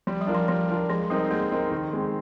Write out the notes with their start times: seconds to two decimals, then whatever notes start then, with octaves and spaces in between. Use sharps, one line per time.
0.07 F3 G3
0.21 G3
0.27 D4 F4 A#4
0.35 F3
0.48 F3 G3
0.69 D4 F4 A#4
0.90 F3 G#3
1.10 G3 C4 D#4 A#4
1.31 G#3 A#3
1.51 C4 D#4 A#4
1.72 D#3
1.93 G#3 C4